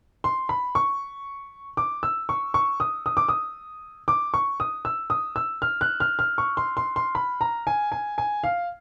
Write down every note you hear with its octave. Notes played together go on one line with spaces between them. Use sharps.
C6
B5
C#6
D6
E6
C#6
C#6
D#6
D#6
D6
D#6
D6
C#6
D#6
E6
D#6
E6
F6
F#6
F6
F6
C#6
C6
C6
C6
B5
A#5
G#5
G#5
G#5
F5